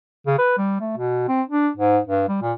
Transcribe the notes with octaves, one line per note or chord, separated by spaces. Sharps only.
C#3
B4
G3
A3
B2
C4
D4
G#2
G2
G3
A#2